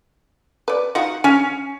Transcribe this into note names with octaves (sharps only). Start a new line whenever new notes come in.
B4 D5
D#4 F4 F#4 F#5
C#4 G#5